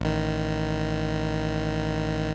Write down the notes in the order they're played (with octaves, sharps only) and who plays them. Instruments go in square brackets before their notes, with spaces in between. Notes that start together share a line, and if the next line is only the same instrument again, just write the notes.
[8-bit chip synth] A1 D#3